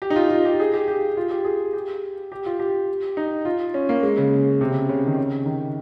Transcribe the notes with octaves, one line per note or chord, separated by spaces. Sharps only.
G4
D#4
F4
F4
G4
G#4
G4
G4
F4
G4
G#4
G4
G4
F4
G4
D#4
F4
C#4
A#3
G#3
C#3
C3
C#3
C#3
D#3
C#3
D#3